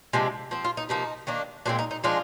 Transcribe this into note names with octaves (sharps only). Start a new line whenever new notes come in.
C3 F3 G#3 D4
F3 C4
F4
D#4
C3 F3 A#3 D#4
D#3 A#3 D4
A#2 G#3 C4 D4
D#4
D#4
F3 G#3 D4 F4